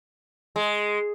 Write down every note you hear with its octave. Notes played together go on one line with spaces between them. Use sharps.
G#3